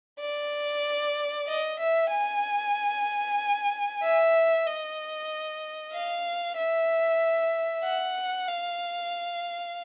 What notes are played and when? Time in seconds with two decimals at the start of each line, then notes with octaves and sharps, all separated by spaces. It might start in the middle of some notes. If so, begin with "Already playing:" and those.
0.20 D5
1.48 D#5
1.79 E5
2.11 G#5
4.02 E5
4.66 D#5
5.93 F5
6.57 E5
7.84 F#5
8.48 F5